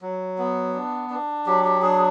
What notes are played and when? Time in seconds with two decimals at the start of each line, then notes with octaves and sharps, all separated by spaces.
0.02 F#3
0.38 B3
0.74 D4
1.10 D4
1.46 F#3 G4
1.65 G4
1.82 D4 G#4